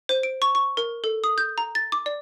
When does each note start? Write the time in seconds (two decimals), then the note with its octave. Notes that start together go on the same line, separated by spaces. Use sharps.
0.09 C5
0.23 D7
0.42 C#6
0.55 C#6
0.77 A#4
1.04 A4
1.24 D#6
1.38 G6
1.58 A#5
1.75 A6
1.92 D6
2.06 D5